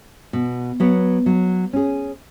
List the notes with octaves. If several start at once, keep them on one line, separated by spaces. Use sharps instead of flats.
B2
F#3 B3
F#3
C#4 G#4